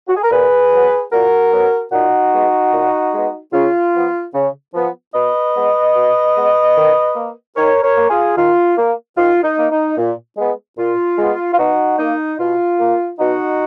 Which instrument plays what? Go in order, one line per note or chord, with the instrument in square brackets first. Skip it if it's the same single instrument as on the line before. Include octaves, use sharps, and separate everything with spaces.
[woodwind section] F#4
G#4
A#4
A#2 G#4 B4
F#3 B3
A#2 F#4 A#4
F#3 B3
A#2 D#4 F#4
G#3 B3
A#2
G#3 B3
C#3 F4
F3 B3
C#3
F3 B3
B2 B4 D#5
G#3 B3
B2
G#3 B3
D#3
A#3
D#3 A#4 C#5
A#4 C#5
A#3
F4 G#4
D#3 F4
A#3
D#3 F4
D#4
A#3
D#4
A#2
G#3 B3
A#2 F4
G#3 B3
F4
B2 D#4 F#4
A#3 D#4
B2 F4
A#3
B2 D#4 F#4